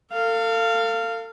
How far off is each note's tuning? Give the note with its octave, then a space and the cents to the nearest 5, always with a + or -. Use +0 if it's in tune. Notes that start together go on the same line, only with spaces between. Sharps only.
A4 +40 F5 -10